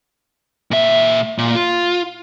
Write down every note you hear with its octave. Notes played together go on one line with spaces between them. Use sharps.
A#2 E5
A#2
F4